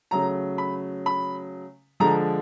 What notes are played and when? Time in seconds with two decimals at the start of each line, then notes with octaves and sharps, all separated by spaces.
0.11 C#3 F#3 A3 A#5
0.58 B5
1.06 B5
2.00 D3 F3 G#3 A#5